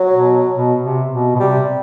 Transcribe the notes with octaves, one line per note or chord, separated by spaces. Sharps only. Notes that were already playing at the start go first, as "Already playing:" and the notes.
Already playing: F#3
B2
B2
C3
B2
B2
C3 G3